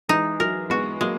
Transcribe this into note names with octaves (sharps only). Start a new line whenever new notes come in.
E3 G#3 D#4
F#3 A#4
G#3 B3 F#4
F#3 G#3 A#3